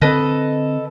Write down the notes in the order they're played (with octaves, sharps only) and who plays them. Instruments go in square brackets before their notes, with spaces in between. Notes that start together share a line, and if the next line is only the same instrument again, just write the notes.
[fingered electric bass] D3 C4 [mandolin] A4 B4 D#5